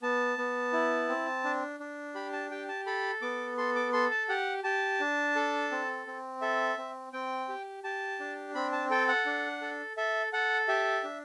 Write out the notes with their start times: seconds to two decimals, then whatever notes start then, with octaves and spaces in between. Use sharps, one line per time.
0.02 B3 A5
0.38 B3
0.73 E4
1.09 C4
1.44 D4
1.80 D4
2.15 G4 B5
2.33 A5
2.51 G4 G5
2.69 A5
2.86 A4 B5
3.22 B3 D6
3.57 A4 C6
3.75 D6
3.93 A4 C6
4.11 A5
4.29 G4 F#5
4.64 G4 A5
5.00 D4
5.36 A4
5.71 C4
6.07 C4
6.41 A4 E5
6.78 C4
7.13 C4 G5
7.49 G4
7.84 G4 A5
8.20 D4
8.55 C4 B5
8.72 A5
8.90 A4 G5
9.08 F#5
9.26 D4
9.61 A4
9.97 A4 E5
10.33 A4 F#5
10.68 G4 E5
11.04 D4